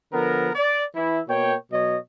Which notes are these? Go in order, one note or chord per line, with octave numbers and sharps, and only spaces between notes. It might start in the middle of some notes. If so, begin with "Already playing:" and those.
D3 F3 B3 A#4
D5
E3 E4
B2 A#3 C#5 G5
B2 F#3 C#5 D#5